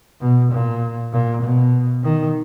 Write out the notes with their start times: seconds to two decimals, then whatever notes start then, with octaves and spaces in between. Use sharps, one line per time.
0.21 B2
0.52 A#2
1.13 A#2
1.42 B2
2.04 D#3